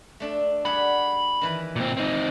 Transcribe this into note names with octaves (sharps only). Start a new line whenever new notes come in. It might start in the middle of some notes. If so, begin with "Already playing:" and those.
A3 D4 A4
G3 G#4 F#5 B5
D#3 E3 B4
A#2 C4
C4 D#4